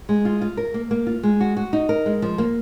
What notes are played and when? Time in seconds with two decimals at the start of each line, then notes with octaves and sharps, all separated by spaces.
0.09 G#3
0.25 F4
0.41 F4
0.57 A#4
0.74 A#3
0.91 A#3
1.07 F4
1.23 G#3
1.40 F#4
1.57 F#4
1.73 D#4
1.89 A#4
2.06 G#3
2.22 F3
2.38 A#3